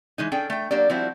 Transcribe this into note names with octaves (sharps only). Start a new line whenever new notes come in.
E3 G#3 D#4
C#4 D4 G#4 A4 G5
A3 G5
F#3 A#3 D4 G4 A#4 D5
F3 G3 C4 E4 F#4